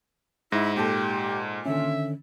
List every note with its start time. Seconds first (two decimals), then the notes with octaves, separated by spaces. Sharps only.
0.52 G#2 E4 A#6
0.76 A#2 G4 A4
1.65 D3 D#3 C#4 E5